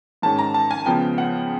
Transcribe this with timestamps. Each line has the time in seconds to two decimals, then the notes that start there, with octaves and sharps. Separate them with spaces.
0.22 G#2 D#3 G#3 C#4 A5
0.39 A#5
0.54 A5
0.71 G#5
0.86 C#3 F3 G#3 B3 G5
1.18 F#5